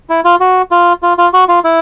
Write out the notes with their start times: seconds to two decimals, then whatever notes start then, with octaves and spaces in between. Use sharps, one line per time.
0.10 E4
0.25 F4
0.40 F#4
0.71 F4
1.03 F4
1.18 F4
1.33 F#4
1.49 F4
1.64 E4